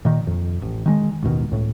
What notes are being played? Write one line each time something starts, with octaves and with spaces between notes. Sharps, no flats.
A#2 D#3
F2
A1
D#3 G3 G#3
A1 D#2 B2 D#3
C#2 A2